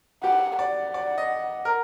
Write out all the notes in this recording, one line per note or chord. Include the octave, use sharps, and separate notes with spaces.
G4 F#5
D5 F#5
D5
D#5
A#4